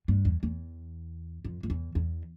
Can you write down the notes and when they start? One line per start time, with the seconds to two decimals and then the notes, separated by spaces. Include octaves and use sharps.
0.08 G2
0.25 E2
0.43 E2
1.45 F2
1.63 F2
1.70 E2
1.95 E2